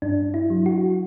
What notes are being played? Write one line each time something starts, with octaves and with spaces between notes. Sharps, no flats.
G2 D4
E4
F#3
F#4